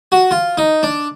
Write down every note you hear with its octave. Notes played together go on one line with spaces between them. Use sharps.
F#4
F4
D#4
D4